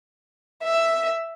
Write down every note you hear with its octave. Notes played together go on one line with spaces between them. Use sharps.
E5